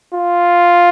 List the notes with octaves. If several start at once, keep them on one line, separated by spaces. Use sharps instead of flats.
F4